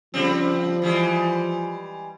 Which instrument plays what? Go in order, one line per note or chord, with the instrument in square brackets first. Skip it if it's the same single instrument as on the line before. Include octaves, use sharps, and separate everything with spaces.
[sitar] C#3 G3 C4 [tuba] F3
[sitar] E3 G3 G#3